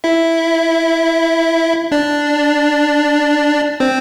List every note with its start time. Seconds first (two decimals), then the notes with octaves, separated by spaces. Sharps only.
0.04 E4 E5
1.92 D4 D5
3.80 C4 C5